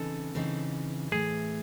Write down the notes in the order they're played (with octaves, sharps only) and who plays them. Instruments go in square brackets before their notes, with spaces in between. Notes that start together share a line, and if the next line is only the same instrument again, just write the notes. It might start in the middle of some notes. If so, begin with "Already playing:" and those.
Already playing: [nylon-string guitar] C#3 E3 C4 D#4 [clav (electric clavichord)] A4
[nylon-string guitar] C#3 E3 C4 D#4
[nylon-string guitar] A2 E3 A3 [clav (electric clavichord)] G#4